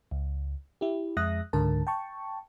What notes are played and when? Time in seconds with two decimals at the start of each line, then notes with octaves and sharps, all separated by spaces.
0.11 C#2
0.81 E4 G4
1.17 F2 G#3 E5 D#6 F#6 A#6
1.53 C#2 G#2 D3 A#4 A5
1.87 G5 A5 C#6